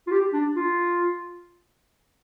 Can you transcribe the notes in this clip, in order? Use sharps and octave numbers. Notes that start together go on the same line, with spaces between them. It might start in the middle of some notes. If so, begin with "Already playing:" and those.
F4
G4
D4
F4